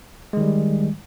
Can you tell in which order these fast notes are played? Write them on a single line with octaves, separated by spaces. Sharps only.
G#3 D#3 G3